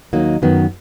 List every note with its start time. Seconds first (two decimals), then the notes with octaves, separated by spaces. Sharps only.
0.13 D#2 D#3 F#3 A#3 D#4
0.42 F#2 D#3 F#3 B3